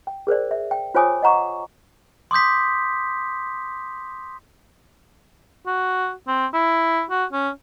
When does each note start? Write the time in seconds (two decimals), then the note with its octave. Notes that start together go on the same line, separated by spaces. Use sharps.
0.07 G5
0.27 G#4 A#4 C5 D5
0.51 E5
0.71 G5
0.95 F4 C5 C#5 G#5 D6 D#6
1.22 D#5 F#5 A#5 C#6 D6
2.31 C6 D6 D#6 G6 B6
5.66 F#4
6.27 C4
6.53 E4
7.10 F#4
7.32 C#4